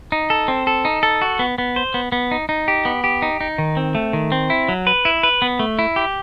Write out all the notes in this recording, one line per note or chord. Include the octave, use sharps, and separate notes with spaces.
D#4
A4
C4
A4
D#4
A4
F#4
B3
B3
C5
B3
B3
D#4
D#4
G4
B3
G4
D#4
D#4
D#3
C4
A3
D#3
C4
E4
F#3
B4
E4
B4
B3
A3
E4
G4